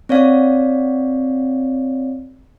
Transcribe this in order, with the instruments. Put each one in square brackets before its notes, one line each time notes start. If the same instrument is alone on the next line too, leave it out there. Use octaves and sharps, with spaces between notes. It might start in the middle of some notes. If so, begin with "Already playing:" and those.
[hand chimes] C4 C#5 D5 F5